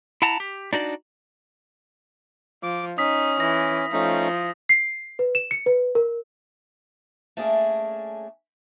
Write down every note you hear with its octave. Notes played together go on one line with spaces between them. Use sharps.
E4 F#5 A5 A#5
G4
D4 D#4 F#4 D5
F3 D6
C#4 D#4 D#6 B6
E3 A#6
F3 A3 C#4 D#4
C7
B4
E7
C#7
B4
A#4
A3 A#3 C#4 D4 G#4